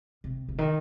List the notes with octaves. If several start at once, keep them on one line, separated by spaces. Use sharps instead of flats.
C3
C3
D#3